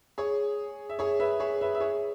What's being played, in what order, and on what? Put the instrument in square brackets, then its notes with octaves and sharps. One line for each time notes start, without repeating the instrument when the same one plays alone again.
[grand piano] G#4 C#5
E5
G#4 C#5
B4 E5
G#4 C#5
B4 E5
E5
G#4 C#5